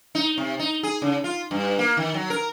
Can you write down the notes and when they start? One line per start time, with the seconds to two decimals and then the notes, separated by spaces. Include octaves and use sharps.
0.15 D#4
0.38 C3
0.59 D#4
0.83 G#4
1.02 C#3
1.24 F4
1.51 G2
1.79 A#3
1.97 D#3
2.14 F#3
2.30 A#4